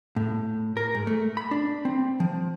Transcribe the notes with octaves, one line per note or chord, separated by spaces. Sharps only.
A2
A#4
G#2
A3
B5
D4
C4
F3